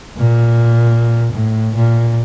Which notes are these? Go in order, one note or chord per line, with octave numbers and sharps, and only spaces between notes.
A#2
A2
A#2